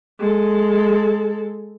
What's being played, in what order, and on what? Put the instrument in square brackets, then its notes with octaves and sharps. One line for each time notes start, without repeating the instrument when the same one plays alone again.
[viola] G#3 A4